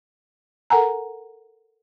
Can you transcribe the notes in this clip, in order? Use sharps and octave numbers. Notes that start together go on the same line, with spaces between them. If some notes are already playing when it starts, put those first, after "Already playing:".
A4 A#4 F#5 G#5 A#5